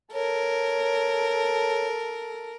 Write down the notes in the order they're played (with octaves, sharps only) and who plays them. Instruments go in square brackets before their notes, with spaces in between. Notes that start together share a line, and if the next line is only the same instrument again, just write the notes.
[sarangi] A4 [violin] A#4 [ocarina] C#5